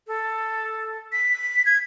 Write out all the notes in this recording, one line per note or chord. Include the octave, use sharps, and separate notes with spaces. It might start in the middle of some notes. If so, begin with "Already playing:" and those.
A4
B6
G#6